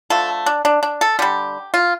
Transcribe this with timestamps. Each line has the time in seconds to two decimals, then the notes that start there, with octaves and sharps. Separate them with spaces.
0.10 D3 F3 A3 A4
0.46 D4
0.65 D4
0.83 D4
1.01 A4
1.19 D3 G3 G4
1.74 F4